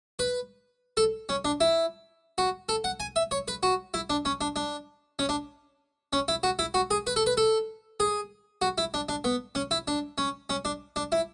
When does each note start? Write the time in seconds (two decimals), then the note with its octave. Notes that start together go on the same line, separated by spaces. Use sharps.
0.19 B4
0.97 A4
1.29 C#4
1.45 D4
1.61 E4
2.38 F#4
2.69 A4
2.84 F#5
3.00 G#5
3.16 E5
3.31 C#5
3.48 B4
3.63 F#4
3.94 E4
4.10 D4
4.25 C#4
4.41 D4
4.56 D4
5.19 C#4
5.29 D4
6.13 C#4
6.28 E4
6.43 F#4
6.59 E4
6.74 F#4
6.91 G#4
7.07 B4
7.16 A4
7.26 B4
7.37 A4
8.00 G#4
8.62 F#4
8.78 E4
8.94 D4
9.09 D4
9.24 B3
9.55 C#4
9.71 E4
9.88 D4
10.18 C#4
10.50 C#4
10.65 D4
10.96 D4
11.12 E4